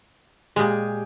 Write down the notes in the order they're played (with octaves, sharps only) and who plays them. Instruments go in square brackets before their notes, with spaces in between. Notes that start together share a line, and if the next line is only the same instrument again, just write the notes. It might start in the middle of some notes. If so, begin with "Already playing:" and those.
[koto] A#2 G#3 [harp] G4 G#4